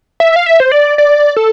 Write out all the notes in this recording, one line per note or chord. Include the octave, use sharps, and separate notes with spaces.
E5
F5
E5
C5
D5
D5
A4